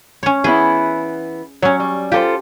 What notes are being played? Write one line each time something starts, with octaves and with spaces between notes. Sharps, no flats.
C#4 C#5
E3 B3 E4 G#4
F#3 C#4 C#5
G3
F4 G4 A4 C5